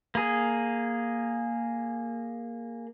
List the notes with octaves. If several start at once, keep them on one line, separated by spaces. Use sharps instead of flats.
A#3 G#4